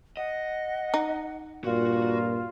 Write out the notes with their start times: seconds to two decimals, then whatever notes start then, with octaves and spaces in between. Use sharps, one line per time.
0.17 D#5 F#5
0.94 D#4
1.64 G2 A#2 F4 F#4